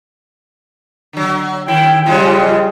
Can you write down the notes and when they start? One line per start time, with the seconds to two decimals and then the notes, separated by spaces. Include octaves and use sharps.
1.13 D3 F#3
1.68 D#3 E4 G5
2.06 C#3 F3 G3 G#3 F4